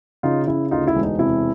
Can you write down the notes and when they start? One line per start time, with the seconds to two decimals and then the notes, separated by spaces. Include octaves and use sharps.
0.23 C#3 D#4 F4
0.47 C#3 E4
0.71 D2 D#4 F4
0.87 E4
0.95 E1
1.03 D#4
1.19 C3 E4